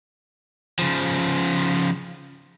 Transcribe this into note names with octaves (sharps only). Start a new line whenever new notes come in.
C#3 F3